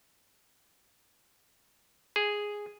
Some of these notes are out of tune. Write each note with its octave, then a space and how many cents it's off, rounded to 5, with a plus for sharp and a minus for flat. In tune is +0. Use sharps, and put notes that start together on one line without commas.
G#4 -5